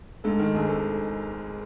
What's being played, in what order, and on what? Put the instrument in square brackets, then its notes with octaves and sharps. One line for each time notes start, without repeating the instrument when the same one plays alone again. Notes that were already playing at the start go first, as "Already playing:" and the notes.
[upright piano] G#2 [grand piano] A4
[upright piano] D#3 [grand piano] A#4
[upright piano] G#1 [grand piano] G#4
[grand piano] A4